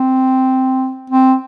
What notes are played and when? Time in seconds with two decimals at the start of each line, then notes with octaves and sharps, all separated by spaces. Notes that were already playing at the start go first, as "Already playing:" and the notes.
Already playing: C4
1.10 C4